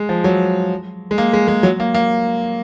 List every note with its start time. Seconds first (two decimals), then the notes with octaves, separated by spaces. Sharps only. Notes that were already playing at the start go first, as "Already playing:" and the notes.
Already playing: G#3
0.09 F3
0.24 F#3
1.11 G#3
1.18 A#3
1.33 G#3
1.48 G#3
1.63 F#3
1.80 A#3
1.94 A#3